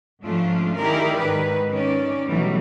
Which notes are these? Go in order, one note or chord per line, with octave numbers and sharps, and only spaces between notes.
G#2 F3 A3 C#4 D4 F4
D#3 E4 G4 G#4 A#4 D5
G#2 D#3 B4
D#3 C#4 D5
B2 D#3 E3 F#3 G3 A3